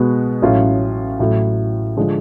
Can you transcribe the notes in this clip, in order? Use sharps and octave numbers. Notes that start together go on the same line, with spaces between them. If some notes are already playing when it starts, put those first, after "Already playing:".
Already playing: B2 G#3 B3 F#4
A1 A2 F#3 C#4 F4
A1 A2 F#3 A3
D3 F3 G#3 D4